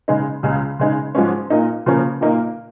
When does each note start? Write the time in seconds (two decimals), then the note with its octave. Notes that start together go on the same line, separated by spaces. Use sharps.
0.08 C#3 G#3 D#4
0.43 C#2 C#3 G#3
0.79 C#3 G#3 D#4
1.15 G#2 F3 G#3 C#4
1.50 A#2 A#3 D#4
1.86 C#3 F3 A#3 C#4
2.21 A#2 A#3 D#4